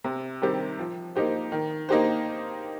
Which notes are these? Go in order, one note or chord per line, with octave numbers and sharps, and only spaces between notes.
C3
D#3 G3 C4 G4
F3
A#3 D#4 G4 C5
D#3
A#3 D#4 G4 C5